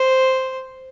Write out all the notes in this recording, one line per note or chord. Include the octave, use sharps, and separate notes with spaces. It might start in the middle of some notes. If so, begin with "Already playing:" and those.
Already playing: C5